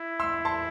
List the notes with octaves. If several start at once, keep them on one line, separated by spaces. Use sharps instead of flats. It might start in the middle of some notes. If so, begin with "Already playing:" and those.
Already playing: E4
C6 E6
A5 C6